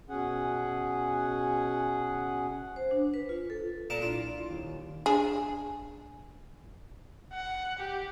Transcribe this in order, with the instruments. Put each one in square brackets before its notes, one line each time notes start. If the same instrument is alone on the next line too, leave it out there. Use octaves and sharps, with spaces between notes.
[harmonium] B2 C#4 G#4 F#5
[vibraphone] C5
D4
B4
F4
A4
[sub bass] D#1 [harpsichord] A#2 A#4 A5
[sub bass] B1 [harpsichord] D4 [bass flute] E4 [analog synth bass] F4
[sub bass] B1
[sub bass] D#1 [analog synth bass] D#2
[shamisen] D4 G#4
[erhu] F#5
G4